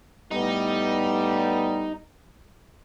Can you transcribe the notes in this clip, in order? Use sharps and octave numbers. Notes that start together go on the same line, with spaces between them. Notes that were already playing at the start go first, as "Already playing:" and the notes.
A2 G3 B3 D#4